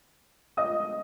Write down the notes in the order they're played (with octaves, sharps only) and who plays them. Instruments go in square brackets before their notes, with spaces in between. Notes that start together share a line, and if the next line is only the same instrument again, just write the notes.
[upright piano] D#5 D#6